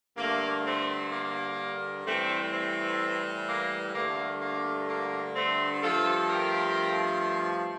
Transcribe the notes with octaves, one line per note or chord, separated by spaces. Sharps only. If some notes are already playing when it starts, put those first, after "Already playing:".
G2 D3 A3 A#3
A3 C4
A#3
A2 E3 G3 A3 C4
A3 C4
A#3
G2 D3 A3 A#3
A#3
A#3
A3 C4
G2 F3 A3 F4 A4
G4 A#4